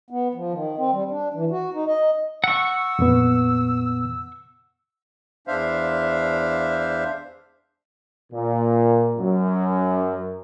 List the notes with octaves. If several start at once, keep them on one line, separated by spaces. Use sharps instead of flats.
B3
F3
D#3
C4
G3
D4
E3
F#4
D#4
D#5
F#5 C#6 E6
F2 A#2 B3
E2 D4 C5 E5 F5
A#2
F#2